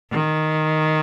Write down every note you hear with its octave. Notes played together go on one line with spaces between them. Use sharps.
D#3